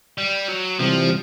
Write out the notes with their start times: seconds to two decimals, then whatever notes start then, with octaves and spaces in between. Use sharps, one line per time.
0.18 G3
0.48 F#3
0.79 C3 E3 F3 G3